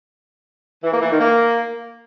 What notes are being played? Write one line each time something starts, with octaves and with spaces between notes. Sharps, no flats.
E3
A#3
E3
D#3
A#3